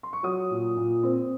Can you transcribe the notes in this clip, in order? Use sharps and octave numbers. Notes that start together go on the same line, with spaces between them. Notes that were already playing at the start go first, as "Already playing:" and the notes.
C6
C#6
F#3 D#6
A#2
A#2
C4